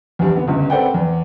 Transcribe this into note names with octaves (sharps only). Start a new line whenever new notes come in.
E2 G2
D3 B3
G1 C#2
C4 A4 B4 D5 F#5 G5
E2